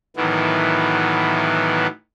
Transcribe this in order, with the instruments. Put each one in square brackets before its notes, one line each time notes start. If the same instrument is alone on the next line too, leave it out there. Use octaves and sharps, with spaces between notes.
[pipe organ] A2 D#3 E3 F#3 B3